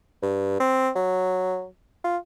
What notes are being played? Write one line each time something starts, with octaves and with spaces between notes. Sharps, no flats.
G2
C4
F#3
F4